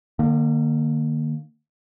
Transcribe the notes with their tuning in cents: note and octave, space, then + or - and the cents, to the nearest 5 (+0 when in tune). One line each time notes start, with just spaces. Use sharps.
D3 +45 A#3 +0